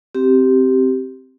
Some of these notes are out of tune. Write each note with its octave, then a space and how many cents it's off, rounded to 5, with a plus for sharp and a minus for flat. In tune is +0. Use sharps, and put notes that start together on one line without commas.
C4 +0 G4 -15